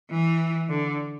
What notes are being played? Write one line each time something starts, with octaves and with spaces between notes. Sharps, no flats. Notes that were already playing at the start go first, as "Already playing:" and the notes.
E3
D3